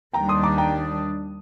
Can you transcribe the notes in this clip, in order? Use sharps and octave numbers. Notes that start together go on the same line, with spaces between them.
D#2 D#3 G3 D4 G5 A#5
C6 D#6
A#5 D6
G5 A#5